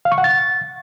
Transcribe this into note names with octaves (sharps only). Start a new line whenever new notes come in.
F5
C#6
F#5
A6